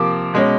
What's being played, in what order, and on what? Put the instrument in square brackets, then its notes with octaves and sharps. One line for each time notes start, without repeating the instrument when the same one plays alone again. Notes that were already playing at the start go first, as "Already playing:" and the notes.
Already playing: [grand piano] C3 F3 A#3 D6
B2 G#3 C#4